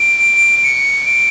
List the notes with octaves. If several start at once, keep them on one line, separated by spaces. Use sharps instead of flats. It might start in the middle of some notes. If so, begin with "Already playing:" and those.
Already playing: D7
C#7
D7